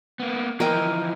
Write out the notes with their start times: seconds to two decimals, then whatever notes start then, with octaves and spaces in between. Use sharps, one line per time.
0.20 A#3 B3
0.60 E3 F3 A#4 D#5 G5